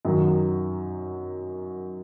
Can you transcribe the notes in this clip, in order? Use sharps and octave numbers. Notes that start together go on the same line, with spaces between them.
F#2 D#3 F#3